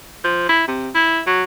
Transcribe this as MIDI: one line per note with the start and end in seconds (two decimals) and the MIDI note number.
0.24 0.47 53
0.49 0.64 64
0.67 0.89 48
0.95 1.21 64
1.27 1.44 54